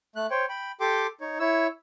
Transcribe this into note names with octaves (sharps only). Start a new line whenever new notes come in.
A3 F#6
C5 C#5 G5
G5 B5
G4 A4 G5 C6 D6
D#4 C#5
E4 C#5 E6